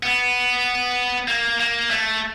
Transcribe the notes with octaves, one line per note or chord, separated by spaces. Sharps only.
B3
A#3
A#3
A3